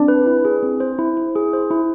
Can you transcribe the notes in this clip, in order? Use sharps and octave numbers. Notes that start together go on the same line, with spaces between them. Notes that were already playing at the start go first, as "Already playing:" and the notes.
Already playing: C4 D4
B4
E4
G#4
C4
C5
E4
E4
G#4
C5
E4